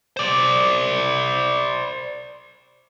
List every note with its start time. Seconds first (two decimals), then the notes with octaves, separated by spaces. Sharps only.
0.17 C5 D5